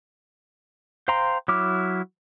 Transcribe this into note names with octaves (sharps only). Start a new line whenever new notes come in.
C5 F5 G5 A#5 C6
F#3 E4 D6 F6